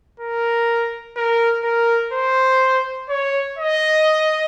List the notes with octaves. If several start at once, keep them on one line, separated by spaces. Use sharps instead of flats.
A#4
A#4
A#4
C5
C#5
D#5